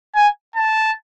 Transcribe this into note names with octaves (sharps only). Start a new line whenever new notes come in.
G#5
A5